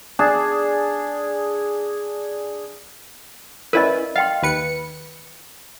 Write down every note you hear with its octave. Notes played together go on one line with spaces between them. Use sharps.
D4 G#4 A5
C#4 E4 A#4 B4 D5 D#5
D#5 F5 G5 C6
D#2 B4 C#7